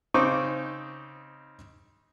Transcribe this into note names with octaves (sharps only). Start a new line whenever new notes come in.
C#3 C4 D#4 C#6 D6